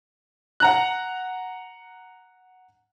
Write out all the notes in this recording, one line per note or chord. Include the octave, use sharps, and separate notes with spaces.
F#5 A#5 F#6